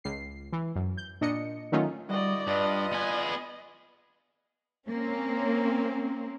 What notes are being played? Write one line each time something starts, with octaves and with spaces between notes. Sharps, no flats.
C#2 C7
E3
F#2
G6
A#2 D4 D#5 C#7
D#3 F#3 A3 C#4 D#4 F4
D3 G3 E4 F#4 D5 D#5
G2 F4 B4 D5 D#5
B3 G#5
A#3 C4 C#4